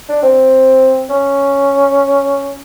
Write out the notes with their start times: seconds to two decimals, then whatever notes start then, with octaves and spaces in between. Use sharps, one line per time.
0.09 D4
0.23 C4
1.10 C#4